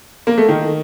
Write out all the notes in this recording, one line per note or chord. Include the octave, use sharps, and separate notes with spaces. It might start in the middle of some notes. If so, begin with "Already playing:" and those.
A#3
A3
D#3